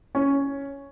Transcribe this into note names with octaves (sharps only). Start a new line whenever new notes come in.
C#4